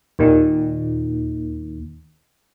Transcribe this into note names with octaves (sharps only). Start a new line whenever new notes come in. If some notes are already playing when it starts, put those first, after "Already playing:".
D#2 A#2 D#3